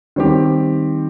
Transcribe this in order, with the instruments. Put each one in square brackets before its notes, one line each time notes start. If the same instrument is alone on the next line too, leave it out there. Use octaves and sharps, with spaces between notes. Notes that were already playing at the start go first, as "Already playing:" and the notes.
[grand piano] D#3 G3 C4 G4